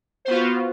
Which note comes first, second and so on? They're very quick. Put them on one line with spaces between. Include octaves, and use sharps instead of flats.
C5 B3 F4 F#4